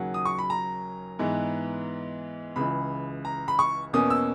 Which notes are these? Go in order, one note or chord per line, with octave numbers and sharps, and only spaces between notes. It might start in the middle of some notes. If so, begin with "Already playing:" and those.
Already playing: D#2 C#3 F#3 C#4 F#5
D#6
C#6
B5
A#5
G#2 E3 B3
C#2 C#3 E3 B5
A#5
B5
C#6
E2 B2 A#3 C#4 D#6
E6